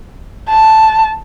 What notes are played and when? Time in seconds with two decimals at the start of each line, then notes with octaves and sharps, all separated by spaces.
0.49 A5